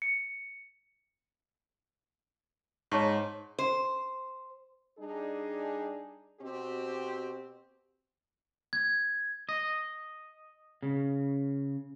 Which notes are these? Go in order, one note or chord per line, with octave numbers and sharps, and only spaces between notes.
C#7
G#2 C#5 A5 C#6
C5
G3 D4 D#4 G#4
B2 C4 F#4 G4
G#6
D#5
C#3